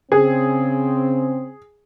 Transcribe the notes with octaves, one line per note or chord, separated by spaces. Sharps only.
C#3 C4 G#4